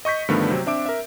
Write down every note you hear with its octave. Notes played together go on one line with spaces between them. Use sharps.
D#5 C#6 G6 B6
G2 D3 D#3 F3 A3 B3
C3 F#3 C4
C4 D4 E5 D6 D7
A#4 E5